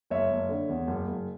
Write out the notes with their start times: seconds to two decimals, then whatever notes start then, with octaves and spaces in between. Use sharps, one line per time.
0.10 F#1 C#5 E5
0.30 F#1
0.49 D3
0.69 E2
0.87 F#1
1.07 F#1